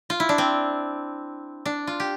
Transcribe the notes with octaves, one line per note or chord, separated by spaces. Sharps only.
F4
E4
D4
C4
D4
F4
G4